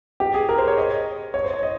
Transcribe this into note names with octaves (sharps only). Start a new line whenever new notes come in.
G4
G#4
A#4
C5
C#5
D#5
C#5
C5
C#5
D#5